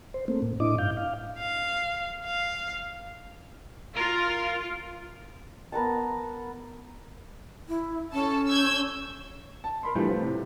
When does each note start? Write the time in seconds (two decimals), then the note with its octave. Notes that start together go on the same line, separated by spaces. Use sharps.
0.14 C5
0.28 A3 A#3 C4
0.42 A2
0.60 A2 D4 E4 D#5 D6
0.78 G2 F5 G6
0.97 F5
1.39 F5
2.25 F5
3.97 F4 A#4
5.72 B3 A#4 F#5 A5
7.69 E4
8.13 C#4 A4 A5
8.48 E6 G6 G#6
9.64 A5
9.83 A#4 B5 C6
9.95 E3 F3 G3 A3 B3 D4
10.07 A3 B3 C4 F4
10.22 A2 C3